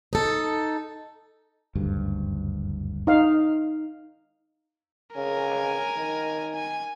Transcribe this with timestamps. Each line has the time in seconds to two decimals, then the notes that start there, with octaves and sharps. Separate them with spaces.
0.13 D#4 A4
1.75 F#1 D2 G2
3.07 D#4 F5
5.16 C#3 A#4 G#5
5.97 D#3
6.55 G#5